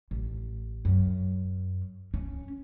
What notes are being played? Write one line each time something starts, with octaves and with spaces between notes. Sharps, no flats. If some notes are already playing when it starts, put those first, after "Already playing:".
A1
F#2
C#4